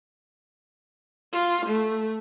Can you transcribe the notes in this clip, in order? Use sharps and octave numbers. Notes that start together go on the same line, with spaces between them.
F4
A3